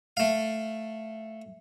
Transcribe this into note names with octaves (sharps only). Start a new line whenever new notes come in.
A3 F5